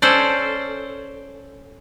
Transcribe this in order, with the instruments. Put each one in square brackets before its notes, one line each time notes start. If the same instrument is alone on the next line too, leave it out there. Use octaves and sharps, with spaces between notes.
[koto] C#4 A4 C5 D5